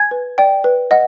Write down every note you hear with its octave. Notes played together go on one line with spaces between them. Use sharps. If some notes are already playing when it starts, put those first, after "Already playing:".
Already playing: G#5 G#6
B4
D5 G5
B4
D#5 F#5